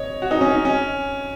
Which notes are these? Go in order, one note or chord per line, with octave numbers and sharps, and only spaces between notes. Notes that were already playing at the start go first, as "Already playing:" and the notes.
Already playing: C#5 D#5
F#4
D#4
C#4
D#4
C#4